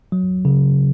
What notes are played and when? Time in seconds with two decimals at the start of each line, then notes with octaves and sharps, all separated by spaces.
0.12 F#3
0.45 C#3